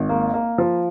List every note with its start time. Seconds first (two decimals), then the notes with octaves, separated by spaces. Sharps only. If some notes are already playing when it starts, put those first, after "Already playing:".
Already playing: G#1
0.09 A#3
0.34 A#3
0.58 F3